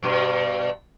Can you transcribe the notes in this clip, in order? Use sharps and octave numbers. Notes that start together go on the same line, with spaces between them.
G2 B2